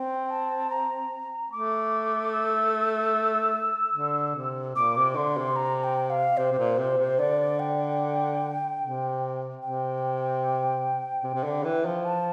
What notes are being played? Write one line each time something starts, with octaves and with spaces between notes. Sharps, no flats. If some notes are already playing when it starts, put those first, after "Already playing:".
Already playing: C4 G5
A5
A#5
A3 D6
E6
D3
C3
A#2 D6
C3
D3 C6
C3
A#5
G5
F5
C3 C5
C3
A#2
C3
C3
D3 D5
G5
C3
C3 G5
C3
C3
D3
E3
F3
A5